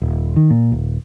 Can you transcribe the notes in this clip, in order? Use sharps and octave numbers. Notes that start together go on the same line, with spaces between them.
D#1
D#3
A#2
D#1